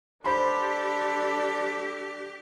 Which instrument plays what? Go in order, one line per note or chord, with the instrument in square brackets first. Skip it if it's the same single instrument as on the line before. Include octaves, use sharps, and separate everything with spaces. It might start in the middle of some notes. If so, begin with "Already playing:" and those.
[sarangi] D4 [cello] G4 [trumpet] A4 [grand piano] C5 B5 C6